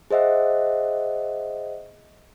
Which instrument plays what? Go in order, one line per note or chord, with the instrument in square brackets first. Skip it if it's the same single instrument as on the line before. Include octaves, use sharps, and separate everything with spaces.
[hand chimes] G#4 C5 D#5 E5 F#5